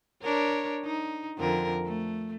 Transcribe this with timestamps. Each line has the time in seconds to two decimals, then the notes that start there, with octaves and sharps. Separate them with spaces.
0.23 D4 A#4 C#5
0.85 D#4
1.38 F2 D3 A#4
1.86 A3